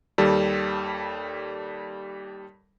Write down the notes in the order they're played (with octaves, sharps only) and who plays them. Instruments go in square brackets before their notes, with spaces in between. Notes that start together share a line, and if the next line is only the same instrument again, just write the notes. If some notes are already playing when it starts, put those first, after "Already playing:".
[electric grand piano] D#2 G3 A4